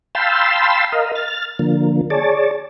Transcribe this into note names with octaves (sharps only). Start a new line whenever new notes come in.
F5 G5 A5 B5 C6 E6
A#4 D#5 F5
F6 A6
D3 F3 A#3
G#4 C#5 D5 A5